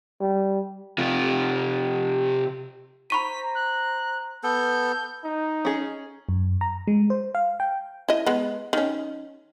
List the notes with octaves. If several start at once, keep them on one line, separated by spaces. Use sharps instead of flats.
G3
C3 F4
C5 A#5 B5 C#6 B6 D#7
F#6
B3 A4 G6
D#4
C#4 G#4
F#2
A#5
G#3
C5
F5
G5
E4 D#5
G#3 B3
D#3 C#4